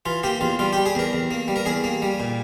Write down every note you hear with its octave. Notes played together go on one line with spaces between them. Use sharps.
E3 F4
A#3 G4
E2 F4
G3 F4
G4
G3
G#4
E2 A#4
E2
A#3
G3
A#4
E2 G#4
A#3
G3
A#2